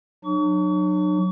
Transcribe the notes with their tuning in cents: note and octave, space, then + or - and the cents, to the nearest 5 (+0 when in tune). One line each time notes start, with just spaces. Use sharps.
F#3 -10 D4 +45 C#6 +35